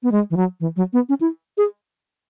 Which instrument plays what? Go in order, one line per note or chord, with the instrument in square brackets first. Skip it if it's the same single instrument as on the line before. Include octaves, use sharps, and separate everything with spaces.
[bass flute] B3
G#3
E3
F#3
E3
F#3
B3
C#4
E4
G#4